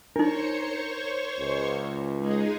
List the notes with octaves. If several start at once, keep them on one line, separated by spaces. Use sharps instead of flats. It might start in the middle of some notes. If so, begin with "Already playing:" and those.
D4 D#4 A#4 C5 C#5 C#6
C#2
G#3 D#4 G#4